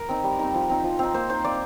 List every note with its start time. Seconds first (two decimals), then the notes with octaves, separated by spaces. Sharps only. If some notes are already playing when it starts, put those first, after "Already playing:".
Already playing: A#4
0.09 C4 D#4
0.24 G3
0.39 C4 D#4
0.54 F3
0.70 C4 D#4
0.84 F3
0.99 C4 D#4
1.14 A#3 C5
1.29 D#4 C5
1.44 A#3 D5